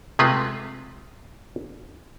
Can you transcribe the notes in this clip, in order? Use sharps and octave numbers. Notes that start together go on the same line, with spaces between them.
C3 G#3 A3 F4 B4